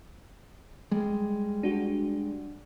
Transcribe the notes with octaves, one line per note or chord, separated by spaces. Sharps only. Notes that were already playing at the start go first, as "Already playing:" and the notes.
G3 G#3
D4 F#4